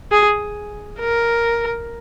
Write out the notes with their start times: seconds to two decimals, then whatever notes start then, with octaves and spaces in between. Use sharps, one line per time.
0.11 G#4
1.00 A#4